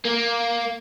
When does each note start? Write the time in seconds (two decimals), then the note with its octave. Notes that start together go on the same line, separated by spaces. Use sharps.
0.05 A#3